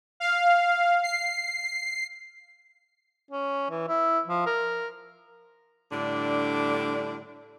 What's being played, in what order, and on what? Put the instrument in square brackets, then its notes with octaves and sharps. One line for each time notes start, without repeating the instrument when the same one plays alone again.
[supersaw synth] F5
C7
[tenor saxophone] C#4
E3
E4
F3
A#4
[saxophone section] A2 D3 G3 D4